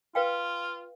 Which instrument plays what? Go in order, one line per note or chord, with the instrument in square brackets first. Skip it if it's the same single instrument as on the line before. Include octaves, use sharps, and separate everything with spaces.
[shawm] F4 [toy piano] B4 F5 G5